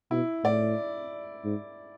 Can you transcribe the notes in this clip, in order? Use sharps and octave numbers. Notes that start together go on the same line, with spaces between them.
B2 E4
A2 D5
G#2